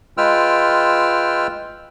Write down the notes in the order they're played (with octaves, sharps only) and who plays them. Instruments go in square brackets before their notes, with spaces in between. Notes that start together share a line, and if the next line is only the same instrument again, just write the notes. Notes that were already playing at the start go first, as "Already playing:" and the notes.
[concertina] G#3 F4 B4 G5 E6 F6